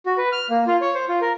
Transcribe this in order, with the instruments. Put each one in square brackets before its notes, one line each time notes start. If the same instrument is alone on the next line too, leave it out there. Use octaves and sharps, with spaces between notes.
[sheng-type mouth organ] F#4
B4
F6
A#3
F4
C#5
C5
F4
A#4